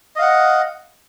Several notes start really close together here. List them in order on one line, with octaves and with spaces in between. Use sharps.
D#5 F5 F#5